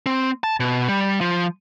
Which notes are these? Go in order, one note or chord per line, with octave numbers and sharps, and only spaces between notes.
C4
A5
B2
G3
F3